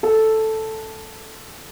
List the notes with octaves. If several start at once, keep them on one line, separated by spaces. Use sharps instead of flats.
A4